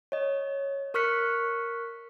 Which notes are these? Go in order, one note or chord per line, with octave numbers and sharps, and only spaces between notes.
C#5 D#5
A#4 C#6 F6 F#6 B6 C#7